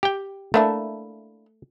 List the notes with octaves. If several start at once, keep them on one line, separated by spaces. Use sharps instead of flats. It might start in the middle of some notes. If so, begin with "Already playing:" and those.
G4 G5
A3 A#3 D4 E4